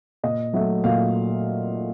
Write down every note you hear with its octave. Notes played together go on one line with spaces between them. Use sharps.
A#2 D#5
F#3 A3 E5
A#2 F5